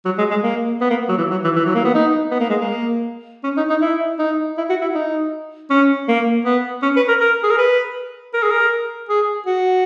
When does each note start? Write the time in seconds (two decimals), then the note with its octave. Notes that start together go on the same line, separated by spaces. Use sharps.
0.05 F#3
0.18 G#3
0.31 G#3
0.43 A#3
0.81 B3
0.90 A#3
1.09 F#3
1.18 E3
1.31 F#3
1.44 E3
1.56 E3
1.65 F#3
1.75 A#3
1.84 B3
1.94 D#4
2.31 B3
2.40 A#3
2.50 G#3
2.60 A#3
3.44 C#4
3.57 D#4
3.70 D#4
3.82 E4
4.19 D#4
4.57 E4
4.69 F#4
4.82 E4
4.95 D#4
5.70 C#4
6.08 A#3
6.45 B3
6.82 C#4
6.96 B4
7.08 A#4
7.20 A#4
7.43 G#4
7.51 A#4
7.58 B4
8.33 A#4
8.43 G#4
8.51 A#4
9.09 G#4
9.46 F#4